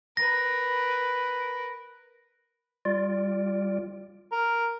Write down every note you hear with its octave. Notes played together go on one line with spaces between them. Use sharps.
A#4 B4 A#6
G3 F4 D5
A#4